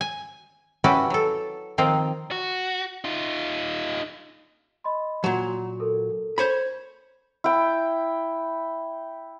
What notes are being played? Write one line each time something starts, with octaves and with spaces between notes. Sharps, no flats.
G#5
C#4 E4 F#4 G4 B4 D5
F#3 A4
D#3 F3 A#3 C4 D#4
F#4
D#4 F4
D#5 B5 C6
A#2 F#3 F#5 A#5 C6
A4 A#4
C5 C#5 B5
E4 G5